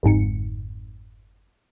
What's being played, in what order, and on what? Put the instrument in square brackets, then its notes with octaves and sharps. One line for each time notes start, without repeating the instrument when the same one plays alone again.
[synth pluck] G1 F2 G#2 C#7